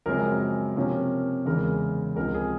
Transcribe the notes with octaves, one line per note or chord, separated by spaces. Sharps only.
F#2 C#3 F3 G#3 C4 A#4
C3 F3 A#3 C#4
E2 C#3 E3 G#3 A#4
C#2 C3 F3 A#4
G#4